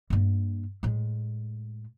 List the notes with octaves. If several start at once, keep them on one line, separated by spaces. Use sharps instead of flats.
G2 A#3
A2 G#3